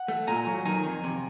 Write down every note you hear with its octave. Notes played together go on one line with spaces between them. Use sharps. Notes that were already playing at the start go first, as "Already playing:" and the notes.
Already playing: F#5
A3
A#2 G#5 A#5
F#3
D#3 G#5 A#5
F2
C3